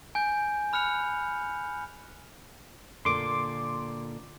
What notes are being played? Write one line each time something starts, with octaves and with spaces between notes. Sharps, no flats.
G#5 G6
B5 F6 F#6 C#7 F7
A#2 D3 C6 D6